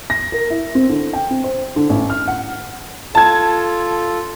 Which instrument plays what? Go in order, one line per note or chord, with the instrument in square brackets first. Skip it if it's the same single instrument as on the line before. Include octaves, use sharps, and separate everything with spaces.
[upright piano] A#6
A#4
E4
C4
D3
G5
C4
C5
D3
A1
F6
F#5
[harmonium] F4 A4 [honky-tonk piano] A5 G#6